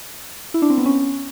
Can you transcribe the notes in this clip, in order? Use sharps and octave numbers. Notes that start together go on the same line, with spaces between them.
E4
D4
C4
B3
C#4